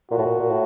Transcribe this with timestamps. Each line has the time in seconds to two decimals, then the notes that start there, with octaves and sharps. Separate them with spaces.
0.11 A#2 F#4
0.18 A2
0.26 A#2
0.39 A#2
0.50 A2